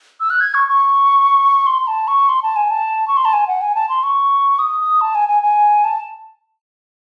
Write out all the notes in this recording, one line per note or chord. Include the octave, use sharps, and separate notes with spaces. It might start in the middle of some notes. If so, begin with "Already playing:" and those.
E6
F#6
G#6
C#6
C#6
C6
A5
C#6
C6
A5
G#5
A5
C#6
C6
A5
G#5
F#5
G#5
A5
C6
C#6
D#6
D#6
A5
G#5
G#5
G#5
A5